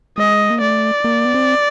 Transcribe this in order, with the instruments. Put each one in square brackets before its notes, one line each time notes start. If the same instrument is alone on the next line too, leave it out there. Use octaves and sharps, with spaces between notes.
[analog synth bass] G#3 [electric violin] D#5
[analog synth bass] A#3
[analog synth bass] A3 [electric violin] D5
[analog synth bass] A#3
B3
C4